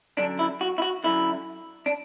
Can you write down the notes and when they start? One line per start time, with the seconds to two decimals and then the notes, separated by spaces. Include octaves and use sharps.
0.17 F#2 D3 D4
0.39 E4
0.61 F#4
0.78 E4
0.82 F#4
1.04 F#2 D3 E4
1.86 D4